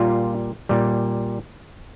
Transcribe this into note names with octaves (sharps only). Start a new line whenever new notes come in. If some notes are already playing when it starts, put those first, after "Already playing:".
Already playing: A#2 G3 F4
A#2 G3